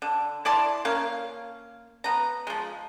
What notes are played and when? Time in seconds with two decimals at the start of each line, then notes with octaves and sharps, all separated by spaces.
0.02 D3
0.45 E4 D5 A5 C6
0.85 A#3 C#4 F5
2.04 B3 A#5
2.47 F3 G#3